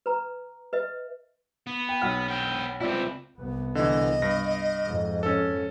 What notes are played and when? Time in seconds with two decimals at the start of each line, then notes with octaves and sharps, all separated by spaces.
0.06 B4 A#5
0.73 B4 D#5 E5
1.67 B3
1.89 G5
2.02 B1 F#5 F6
2.28 B3 G5
2.81 C#2 C4 E4 D5
3.39 C2 B3
3.75 D3 E3 D#5
4.22 G2 A#6
4.86 F2 G#2
5.23 C#4 A4